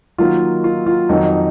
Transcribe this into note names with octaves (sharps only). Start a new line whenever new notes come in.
D#3 F#3 A#3 F4
F4
F4
F2 D#3 F#3 D#4